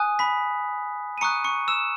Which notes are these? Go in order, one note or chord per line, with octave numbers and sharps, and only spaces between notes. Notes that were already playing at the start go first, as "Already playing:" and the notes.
Already playing: G#5 D#6 F#6
B5 B6
D#7
A#5 C#6 D#6 F#6 C#7
C#6 C#7
E6 E7